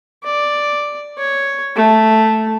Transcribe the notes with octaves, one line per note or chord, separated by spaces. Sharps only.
D5
C#5
A3